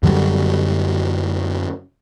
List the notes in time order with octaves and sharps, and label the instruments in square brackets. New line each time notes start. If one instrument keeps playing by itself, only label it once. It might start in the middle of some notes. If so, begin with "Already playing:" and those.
[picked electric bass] F#2 D3 F#3 G3